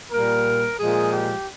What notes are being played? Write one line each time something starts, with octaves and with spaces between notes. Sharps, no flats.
A#2 G3 A#3 A#4
A#2 F3 G#3 G#4
G4